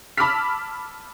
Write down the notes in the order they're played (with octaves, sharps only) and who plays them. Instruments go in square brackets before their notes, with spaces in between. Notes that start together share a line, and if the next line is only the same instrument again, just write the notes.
[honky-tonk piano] A5 B5 D6 E6 F6 B6